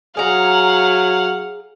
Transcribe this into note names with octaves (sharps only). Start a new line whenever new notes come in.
F#3 G#4 F5 F#5 A#5